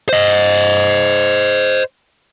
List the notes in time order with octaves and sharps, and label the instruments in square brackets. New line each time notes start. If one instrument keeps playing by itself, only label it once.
[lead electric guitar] C5 D#5